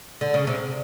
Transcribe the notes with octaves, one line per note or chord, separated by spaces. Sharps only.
D3
C#3
C3